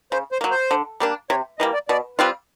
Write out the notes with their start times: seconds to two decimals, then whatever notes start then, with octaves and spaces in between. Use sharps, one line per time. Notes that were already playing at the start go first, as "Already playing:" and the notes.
0.12 C#3 C5
0.32 C5
0.41 F#3 A#3
0.51 C5
0.71 D3
1.00 G3 A#3 D4
1.30 C3 C#5
1.59 E3 G3 A#3 D#5
1.74 D5
1.88 B2 D5
2.18 G3 C4 F4 B4